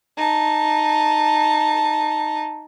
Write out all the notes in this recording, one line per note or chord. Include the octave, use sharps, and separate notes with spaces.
D#4 A5